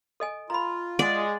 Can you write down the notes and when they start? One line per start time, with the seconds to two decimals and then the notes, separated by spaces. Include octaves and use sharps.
0.20 A4 D#5 G#5
0.50 F4 A#5 B5
0.99 G#3 D5 F#5